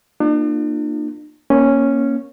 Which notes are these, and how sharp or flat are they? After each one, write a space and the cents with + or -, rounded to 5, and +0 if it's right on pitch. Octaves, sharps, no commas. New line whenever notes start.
A#3 +0 D4 +45 F4 +0
A#3 +20 C#4 +0